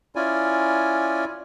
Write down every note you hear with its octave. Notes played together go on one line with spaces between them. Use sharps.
C#4 E4 F4 D5 G#5